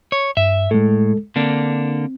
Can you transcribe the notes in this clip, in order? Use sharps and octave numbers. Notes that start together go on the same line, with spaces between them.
C#5
G2 E5
A2 G#3 A4
D3 A#3 C4 D4